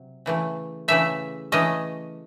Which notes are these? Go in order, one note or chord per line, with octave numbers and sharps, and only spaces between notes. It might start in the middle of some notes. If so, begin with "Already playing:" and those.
Already playing: C3 F#3
C#3 E3 A3
C#3 E3 A3 E5
E3 A3 C#4 D#5